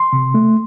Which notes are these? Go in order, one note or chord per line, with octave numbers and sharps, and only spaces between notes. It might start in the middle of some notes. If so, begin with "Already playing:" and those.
Already playing: C6
C3
A3